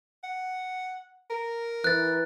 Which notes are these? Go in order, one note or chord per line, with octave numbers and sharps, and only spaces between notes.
F#5
A#4
E3 F#6 A6